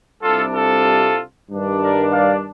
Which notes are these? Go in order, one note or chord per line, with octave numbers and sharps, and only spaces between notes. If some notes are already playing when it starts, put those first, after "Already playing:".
C2 C3 G3 D4 F4 A4
F4 A4
G2 D#3 G3 D4
A#4 D5
D5 F5